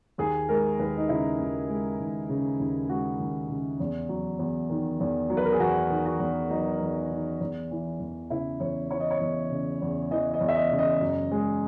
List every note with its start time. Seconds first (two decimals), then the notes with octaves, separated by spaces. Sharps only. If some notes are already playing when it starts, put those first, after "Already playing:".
0.18 D#2 G#4
0.49 G#3 A#4
0.79 D#2 B4
0.97 D#4
1.09 C#3 E4
1.39 D#2
1.70 G#3
1.99 D#2
2.29 C#3
2.59 D#2
2.89 G#3 F#4
3.19 D#2
3.49 C#3
3.80 E2
4.09 F#3
4.39 E2
4.70 D#3
5.00 E2
5.30 F#3
5.37 B4
5.45 A#4
5.53 G#4
5.60 E2 F#4
5.90 D#3
6.05 F#4
6.20 E2
6.50 F#3 D#4
6.80 E2
7.11 D#3
7.40 E2
7.71 E3
8.00 E2
8.30 C#3 E4
8.60 E2 C#5
8.91 E3 C#5
9.00 D#5
9.11 C#5
9.21 E2
9.50 C#3
9.81 E2
10.11 E3 D#5
10.34 D#5
10.40 E2
10.49 E5
10.56 D#5
10.71 C#3
10.79 D#5
11.01 F#2
11.31 G#3